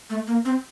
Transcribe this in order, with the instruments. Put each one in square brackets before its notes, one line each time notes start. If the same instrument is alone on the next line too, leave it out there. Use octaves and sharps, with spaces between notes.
[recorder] A3
A#3
C4